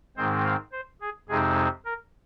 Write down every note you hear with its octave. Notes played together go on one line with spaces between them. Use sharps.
G#2 D#3 G#3 C4 C5
F5
C5
G#4
F2 C3 G#3 C4 D#4 G#4
A#4